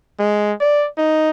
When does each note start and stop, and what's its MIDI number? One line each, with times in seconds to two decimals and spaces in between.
0.19 0.53 56
0.61 0.88 74
0.98 1.30 63